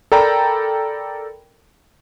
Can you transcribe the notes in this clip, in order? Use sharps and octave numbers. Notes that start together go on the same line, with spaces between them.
A4 A#4 D5 G5 A#5 B5